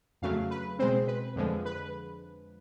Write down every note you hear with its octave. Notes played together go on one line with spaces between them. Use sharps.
F2 C#3 F#3 A3 F5
B4
B2 G#3 C4 C5
B4
F2 D3 F3 G#3
B4